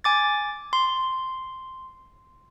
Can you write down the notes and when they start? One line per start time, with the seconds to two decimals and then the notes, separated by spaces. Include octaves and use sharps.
0.04 G#5 D6 A6
0.73 C6